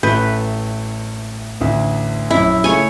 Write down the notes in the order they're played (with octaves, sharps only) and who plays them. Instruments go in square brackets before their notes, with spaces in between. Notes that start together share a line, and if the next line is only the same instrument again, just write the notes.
[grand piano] A1 A3 G6 [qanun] B4
[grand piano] A1 D2
[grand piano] A#1 F#2 [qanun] E4
[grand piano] C#3 A3 [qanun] C#5 G#5